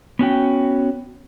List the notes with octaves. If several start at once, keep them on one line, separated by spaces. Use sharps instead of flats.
B3 C#4 F#4 G5